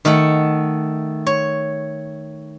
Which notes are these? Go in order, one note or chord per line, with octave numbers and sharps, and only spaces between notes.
D#3 A3 A4 F#5
C#5